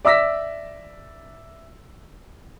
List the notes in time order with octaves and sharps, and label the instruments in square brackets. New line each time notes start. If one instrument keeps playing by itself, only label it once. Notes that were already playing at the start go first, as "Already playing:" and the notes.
[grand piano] D5 E5 D6 E6 A#6 B6